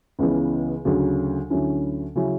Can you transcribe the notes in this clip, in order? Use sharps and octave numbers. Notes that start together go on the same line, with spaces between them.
C#2 C#3 E3 B3
D2 C#3 F#3
D2 D3 F#3 C#4 E4
C#3 F#3 C#4 E4